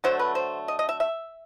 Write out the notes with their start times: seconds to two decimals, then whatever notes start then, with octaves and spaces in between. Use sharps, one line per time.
0.04 D3 F#3 A3 C5
0.19 B4
0.35 C5
0.68 D#5
0.79 D#5
0.89 E5
1.00 E5